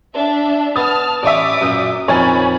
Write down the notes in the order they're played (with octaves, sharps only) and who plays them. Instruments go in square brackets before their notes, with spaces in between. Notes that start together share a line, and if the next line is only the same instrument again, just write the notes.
[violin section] D4 E5
[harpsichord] B3 [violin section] A5 F6 [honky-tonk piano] D#6 A6
[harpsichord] A1 C#5 G#5 [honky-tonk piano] D5 E5 [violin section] D6 D#6
[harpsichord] F#2 A#2
[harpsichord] F2 A#2 D#3 [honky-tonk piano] C#5 G#5 A6 [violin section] B5